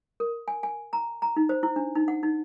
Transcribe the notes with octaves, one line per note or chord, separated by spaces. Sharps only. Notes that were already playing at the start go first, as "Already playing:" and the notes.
A#4
G#5
G#5
A#5
A#5
D#4
C5
E4
D4
D#4
F#5
D#4